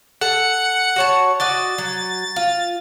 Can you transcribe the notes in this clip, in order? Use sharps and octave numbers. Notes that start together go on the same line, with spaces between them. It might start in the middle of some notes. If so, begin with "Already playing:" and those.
A4 F#5 C#7
F#4 C#5 A5
F#4 D5 D#5 A6
F#3
F4